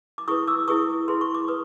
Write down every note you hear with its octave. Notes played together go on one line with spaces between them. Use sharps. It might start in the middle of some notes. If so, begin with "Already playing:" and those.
D6
E4 G#4 B4 C#6 D#6
D6 E6
E4 G#4 B4 C#6 D#6
E4 G#4 B4 C6
C#6
D6
B4 C#6 D#6